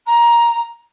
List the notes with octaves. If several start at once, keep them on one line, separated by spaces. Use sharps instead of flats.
A#5